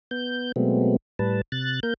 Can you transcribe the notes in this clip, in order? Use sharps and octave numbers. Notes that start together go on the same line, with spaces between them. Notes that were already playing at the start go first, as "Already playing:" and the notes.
B3 G6
B2 F#3 G#3 A3 B3 C4
A2 G3 B4 A5
C3 F#6 A6
A#3 A#4 G6